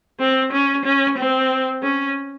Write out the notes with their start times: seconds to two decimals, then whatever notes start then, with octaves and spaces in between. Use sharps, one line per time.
0.20 C4
0.52 C#4
0.85 C#4
1.18 C4
1.82 C#4